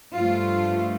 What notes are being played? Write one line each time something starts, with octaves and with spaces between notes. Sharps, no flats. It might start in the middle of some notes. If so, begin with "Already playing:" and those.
G2 F3 A3 F4